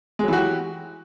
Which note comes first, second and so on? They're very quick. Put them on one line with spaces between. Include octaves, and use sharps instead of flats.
G#3 F#3 E3 F#4 G4